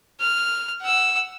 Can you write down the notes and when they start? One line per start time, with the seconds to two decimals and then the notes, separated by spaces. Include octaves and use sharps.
0.20 F6
0.82 F#5 E6